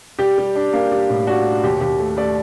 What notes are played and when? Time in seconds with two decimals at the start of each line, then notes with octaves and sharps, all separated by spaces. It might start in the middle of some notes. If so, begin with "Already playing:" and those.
0.19 G3 G4
0.38 G3
0.55 D4
0.73 A#3
0.91 G3
1.09 A2
1.27 D4 F#4
1.45 G3
1.63 D#2 G4
1.81 D#2 G4
1.99 A3
2.17 A3 D5